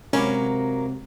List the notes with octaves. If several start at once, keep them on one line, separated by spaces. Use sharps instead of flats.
C3 F#3 G#3 A#3 C#4 B5 D6